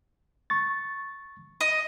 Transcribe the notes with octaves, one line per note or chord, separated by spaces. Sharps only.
C#6 A6
D#5